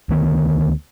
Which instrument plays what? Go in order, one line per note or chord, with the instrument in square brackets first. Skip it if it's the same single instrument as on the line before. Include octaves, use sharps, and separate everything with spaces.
[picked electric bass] D2 D#3 B3